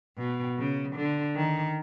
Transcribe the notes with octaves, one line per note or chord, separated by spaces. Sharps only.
B2
C#3
D3
D#3